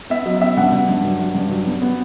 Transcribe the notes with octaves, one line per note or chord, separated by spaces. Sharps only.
B3 E5
F#3 D#5
B3 E5
G2 F#5
G2
G2
F#3
F#3
G2
F#3
B3
B3